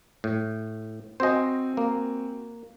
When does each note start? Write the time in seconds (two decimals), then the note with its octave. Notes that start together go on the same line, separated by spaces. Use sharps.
0.24 A2
1.20 C4 F#4 C5 D#5 G#5
1.77 A#3